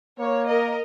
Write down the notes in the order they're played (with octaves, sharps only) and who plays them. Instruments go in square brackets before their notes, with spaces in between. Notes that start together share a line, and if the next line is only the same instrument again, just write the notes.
[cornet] A#3 [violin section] C#5
[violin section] A#4 D#5